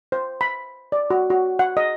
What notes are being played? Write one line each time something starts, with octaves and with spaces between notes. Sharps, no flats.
C5
B5
D5
F#4
F#4
F#5
D#5